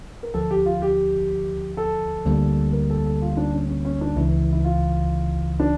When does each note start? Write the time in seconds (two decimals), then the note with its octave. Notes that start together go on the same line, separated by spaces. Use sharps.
0.23 A#4
0.34 D2 D3 F3 A4
0.51 G4
0.66 F4
0.82 G4
1.77 A4
2.25 D2 D3 G3 A#3
2.73 A#4
2.90 A4
3.06 A4
3.22 F4
3.37 D4
3.53 C#4
3.69 C#4
3.85 C#4
4.01 D4
4.16 C#2 C#3 E3 E4
4.52 E4
4.65 F4
5.60 D4